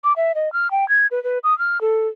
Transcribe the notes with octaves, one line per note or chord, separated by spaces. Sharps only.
D6
E5
D#5
F6
G5
G#6
B4
B4
D#6
F6
A4